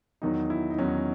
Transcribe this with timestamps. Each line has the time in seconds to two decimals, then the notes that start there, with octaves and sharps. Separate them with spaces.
0.22 E2 D#3 F#3 D#4
0.50 E4
0.70 D#4
0.78 E2 D#3 F#3 C#4